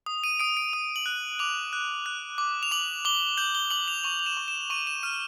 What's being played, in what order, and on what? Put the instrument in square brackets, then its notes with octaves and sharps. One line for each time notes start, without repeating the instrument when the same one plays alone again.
[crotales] D#6
D#7
D#6 D7
D7
D#6
F#7
F#6
D6 F7
F#6
F#6
D6
F7
D6 F#7
D6 G7
G6 F#7
G7
D6 F#7
F7
C#6 F7
F7
E7
C#6
E7
C#6 D#7
E7
F6 D#7